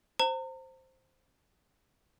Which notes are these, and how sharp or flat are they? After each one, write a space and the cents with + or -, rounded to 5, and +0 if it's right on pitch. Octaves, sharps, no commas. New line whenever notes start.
C5 +0 A#5 -40